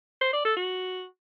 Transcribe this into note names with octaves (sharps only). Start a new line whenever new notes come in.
C5
D5
A4
F#4